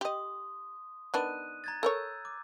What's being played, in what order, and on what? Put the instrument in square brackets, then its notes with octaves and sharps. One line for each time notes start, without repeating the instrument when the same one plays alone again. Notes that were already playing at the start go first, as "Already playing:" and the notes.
[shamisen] G4 D#5 [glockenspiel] C6 D#6
[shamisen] D#3 B3 D4 [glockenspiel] F#6 D#7
[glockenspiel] A#5 G#6 A6
[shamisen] A4 A#4 C#5 [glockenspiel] E6 G6
[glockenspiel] D6